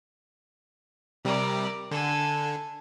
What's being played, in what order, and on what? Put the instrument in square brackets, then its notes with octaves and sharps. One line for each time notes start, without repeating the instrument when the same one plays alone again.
[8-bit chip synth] C3 G3 [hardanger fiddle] A#4 D5
[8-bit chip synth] D3 [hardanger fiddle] A4 G#5